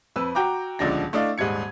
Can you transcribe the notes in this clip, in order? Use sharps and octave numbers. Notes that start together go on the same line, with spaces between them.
F2 B4 E6
F#4 G5 A#5 D6
D#1 C#2 D3 F3 D4 A#6
A3 D4 E4 D#5 F5
D#1 G#2 G3 G#6 C#7